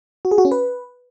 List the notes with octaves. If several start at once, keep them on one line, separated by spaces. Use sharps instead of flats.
F#4
G#4
F#4
C#4
B4